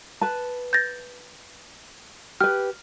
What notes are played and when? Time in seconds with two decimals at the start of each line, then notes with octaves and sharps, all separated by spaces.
0.21 B4 A5
0.73 G6 A6 A#6
2.40 G4 B4 F6